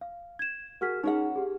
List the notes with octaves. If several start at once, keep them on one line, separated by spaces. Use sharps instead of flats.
F5
G#6 E7
F#4 G#4 A#4 F6 B6
C#4 D#4 G#4 A#4 F#5
G4 G#4